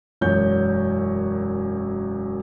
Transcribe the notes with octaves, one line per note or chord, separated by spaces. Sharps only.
E1 F#2 C#5 G6